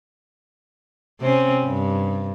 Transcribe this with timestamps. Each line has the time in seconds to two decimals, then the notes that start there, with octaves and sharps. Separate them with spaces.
1.21 C3 C4 C#4
1.64 G2